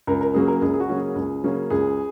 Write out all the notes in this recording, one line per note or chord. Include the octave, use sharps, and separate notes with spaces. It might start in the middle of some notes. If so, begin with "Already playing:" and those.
C#2 A#4
A#4
C#3 F#3 A#3 C#4 G#4
A#4
C#2 G#4
G#4
F#4
C#3 F#3 A#3 C#4
G#4
C#2
C#3 F#3 A#3 C#4
C#2 G#4